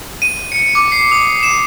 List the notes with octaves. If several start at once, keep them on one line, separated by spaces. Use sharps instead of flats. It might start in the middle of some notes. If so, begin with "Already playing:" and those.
D#7
C#7
D6
C7
D#6
E7